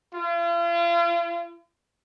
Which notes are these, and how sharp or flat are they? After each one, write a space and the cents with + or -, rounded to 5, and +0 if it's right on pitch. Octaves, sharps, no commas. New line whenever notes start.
F4 -40